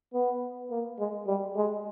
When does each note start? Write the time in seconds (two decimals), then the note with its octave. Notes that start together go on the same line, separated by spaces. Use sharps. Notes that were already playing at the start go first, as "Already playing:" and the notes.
0.14 B3
0.71 A#3
0.99 G#3
1.27 G3
1.56 G#3